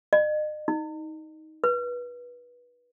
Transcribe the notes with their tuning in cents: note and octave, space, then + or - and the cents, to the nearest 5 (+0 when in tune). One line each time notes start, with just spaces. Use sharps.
D#5 -40
D#4 +15
B4 -20